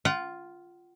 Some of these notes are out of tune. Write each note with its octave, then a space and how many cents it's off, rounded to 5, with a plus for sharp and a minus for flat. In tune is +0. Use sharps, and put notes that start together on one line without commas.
F4 +0 F#5 +40